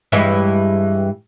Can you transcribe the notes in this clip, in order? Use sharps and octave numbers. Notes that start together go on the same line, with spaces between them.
G2 E3 G#3